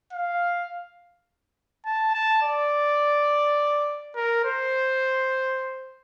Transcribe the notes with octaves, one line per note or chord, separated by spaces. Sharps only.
F5
A5
A5
D5
A#4
C5